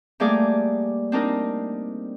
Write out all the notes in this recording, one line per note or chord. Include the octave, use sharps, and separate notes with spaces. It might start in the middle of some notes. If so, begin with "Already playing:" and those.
G3 A3 A#3 G4 G#4 D5
C4 D4 D#4 A#4